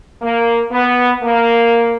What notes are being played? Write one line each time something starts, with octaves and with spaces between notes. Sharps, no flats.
A#3
B3
A#3